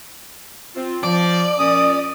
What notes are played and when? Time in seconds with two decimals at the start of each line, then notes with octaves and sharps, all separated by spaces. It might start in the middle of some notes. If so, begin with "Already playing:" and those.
0.76 C4 F4
1.03 F3 D5
1.58 A#2 C#4 D#6